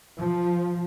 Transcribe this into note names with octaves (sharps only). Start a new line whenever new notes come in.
F3